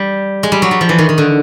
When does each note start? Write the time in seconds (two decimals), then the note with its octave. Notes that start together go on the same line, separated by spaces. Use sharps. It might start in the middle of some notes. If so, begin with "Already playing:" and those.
Already playing: G3
0.43 G#3
0.52 G3
0.62 F#3
0.71 G3
0.81 F3
0.89 E3
0.99 D#3
1.09 D#3
1.18 D3